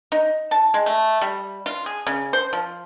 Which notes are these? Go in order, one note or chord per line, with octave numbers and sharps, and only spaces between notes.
D#4
A5
G#3
A3
G3
F4
G#4
C#3
C5
F3